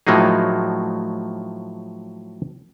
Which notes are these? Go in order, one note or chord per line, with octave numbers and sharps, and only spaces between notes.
A2 F3 F#3 A#3 D#4 G#4